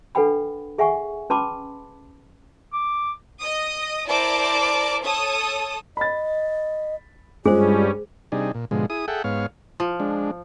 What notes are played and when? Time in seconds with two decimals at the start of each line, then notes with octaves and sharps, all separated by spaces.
0.15 D4 A4 B4 F#5 G5 B5
0.78 G#4 E5 F#5 G#5 C#6
1.30 C#4 B4 A5 B5 C6 D6
2.73 D6
3.41 D#5 D#6
4.06 E4 A#4 C5 D5 A5 D6
5.02 A4 C#5 A5 D#6
5.97 D#5 B5 A6
7.46 G2 G3 G#3 C#4 F4 G#4 C5
8.32 C3 G3 D4 D#4 G#4
8.54 A#2
8.71 G#2 B2 D3 F3 G#3
8.90 E4 G#4 D#6
9.08 G#4 A4 E5 F#5 G5
9.24 G#2 B3 C#5 F5
9.80 F3
10.00 G#3 D4